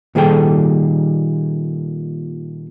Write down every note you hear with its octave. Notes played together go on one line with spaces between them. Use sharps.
A#2 D#3 G3 G#4 A4 G5